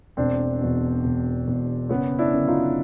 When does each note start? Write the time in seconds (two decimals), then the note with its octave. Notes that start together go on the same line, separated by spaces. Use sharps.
0.17 E1 C4 D4
0.61 E2 B2
1.04 E1
1.47 E2 B2
1.89 F#1 B3 C#4
2.19 D4 E4
2.33 F#2 D3
2.47 D#4 F4